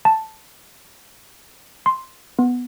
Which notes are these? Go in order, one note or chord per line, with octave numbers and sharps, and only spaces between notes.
A5
C6
B3